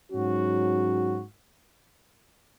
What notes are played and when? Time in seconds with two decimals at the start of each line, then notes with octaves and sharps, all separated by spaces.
0.11 G#2 F#3 C#4 F#4